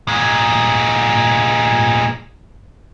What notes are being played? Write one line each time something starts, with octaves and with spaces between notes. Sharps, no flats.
A#2 G#3